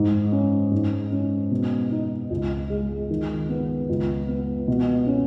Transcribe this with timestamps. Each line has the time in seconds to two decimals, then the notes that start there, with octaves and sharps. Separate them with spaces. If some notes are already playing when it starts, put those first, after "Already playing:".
Already playing: G#2
0.32 C#4
0.72 G#2
1.12 C#4
1.51 B2
1.91 D#4
2.30 C#2
2.70 G#3
3.10 D#3
3.49 B3
3.89 C#2
4.28 B3
4.68 B2
5.07 C#4